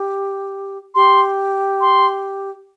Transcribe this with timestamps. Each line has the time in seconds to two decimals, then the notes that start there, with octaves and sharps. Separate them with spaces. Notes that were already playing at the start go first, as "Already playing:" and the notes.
Already playing: G4
0.95 G4 C6
1.81 C6